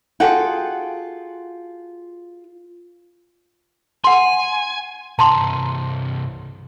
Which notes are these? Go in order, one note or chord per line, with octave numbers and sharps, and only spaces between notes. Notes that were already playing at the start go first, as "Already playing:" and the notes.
F4 F#4 G#4 A4 F#5 G5
F#5 G#5 C6
C2 G2 A5 A#5 C6